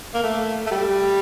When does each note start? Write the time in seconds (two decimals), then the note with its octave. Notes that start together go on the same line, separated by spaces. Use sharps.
0.14 A#3
0.23 A3
0.67 A3
0.71 G3